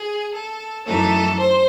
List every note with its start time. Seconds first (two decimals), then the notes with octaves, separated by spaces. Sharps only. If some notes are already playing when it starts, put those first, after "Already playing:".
Already playing: G#4
0.33 A4
0.86 F#2 E3 A3 D#4 A4
1.38 C5